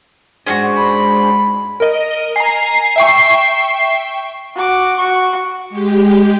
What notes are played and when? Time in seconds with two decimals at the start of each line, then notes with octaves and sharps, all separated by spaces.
0.47 G#2 C#4 D4 F4 F#4 G#4 C5
0.77 B5
1.80 A#4 D#5
2.36 G#5 A#5 C7
2.96 E5 G5 C#6
4.56 F#4 D6
4.96 F#4 C#6
5.70 G#3 G4